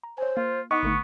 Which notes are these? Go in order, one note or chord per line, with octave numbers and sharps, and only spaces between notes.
A#5
C5 C#5 G#5
A#3 F4
B3 D#4 D#5 F#5 C#6 D6
G#1 D3 A3